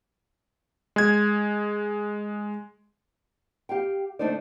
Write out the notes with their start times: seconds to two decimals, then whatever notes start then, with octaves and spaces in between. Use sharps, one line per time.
0.96 G#3 G#6
3.69 G4 F5 G5
4.19 D2 A3 D4 D#4 C5 D5